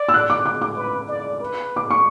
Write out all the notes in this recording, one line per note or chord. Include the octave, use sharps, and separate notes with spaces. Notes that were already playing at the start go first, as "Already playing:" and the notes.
Already playing: D5
E6
F#6
D6
D6
D6
B4
D5
B4
D6
C#6